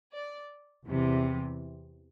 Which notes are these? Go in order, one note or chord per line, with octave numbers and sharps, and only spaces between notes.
D5
E2 C3 E3